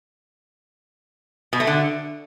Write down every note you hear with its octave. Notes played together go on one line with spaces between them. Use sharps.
B2
A3
D3